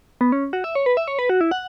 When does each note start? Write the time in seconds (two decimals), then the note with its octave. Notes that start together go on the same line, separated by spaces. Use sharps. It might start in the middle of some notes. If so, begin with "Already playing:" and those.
0.21 B3
0.32 C#4
0.53 F#4
0.64 E5
0.75 C#5
0.86 B4
0.97 E5
1.08 C#5
1.19 B4
1.30 F#4
1.41 E4
1.51 F#5